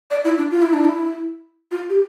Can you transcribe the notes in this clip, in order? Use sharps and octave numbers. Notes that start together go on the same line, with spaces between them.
D5
E4
D4
F4
E4
D4
E4
F4
G4